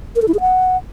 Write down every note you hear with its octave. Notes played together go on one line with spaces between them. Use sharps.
A#4
A4
E4
G#4
F#5